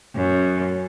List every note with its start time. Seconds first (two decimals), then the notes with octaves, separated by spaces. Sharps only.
0.15 F#2